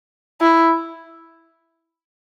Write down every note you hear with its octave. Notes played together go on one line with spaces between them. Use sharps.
E4